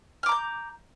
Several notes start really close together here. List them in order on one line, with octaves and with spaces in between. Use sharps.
F6 D6 A#5 G6